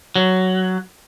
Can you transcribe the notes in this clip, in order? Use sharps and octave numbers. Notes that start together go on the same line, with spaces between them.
F#3